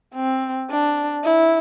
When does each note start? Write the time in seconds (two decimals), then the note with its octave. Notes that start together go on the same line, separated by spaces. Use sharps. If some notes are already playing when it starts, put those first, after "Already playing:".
0.15 C4
0.70 D4
1.24 E4